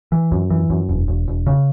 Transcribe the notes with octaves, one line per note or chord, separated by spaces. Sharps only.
E3
F#2
E3
F#2
E1
E1
E1
C#3